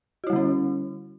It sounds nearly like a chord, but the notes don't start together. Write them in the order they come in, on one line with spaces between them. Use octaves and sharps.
F#4 E4 G3 D3 C#4